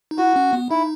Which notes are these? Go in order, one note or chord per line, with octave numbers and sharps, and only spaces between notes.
D#4
E4 F#4
C#4
B3
D#4 E4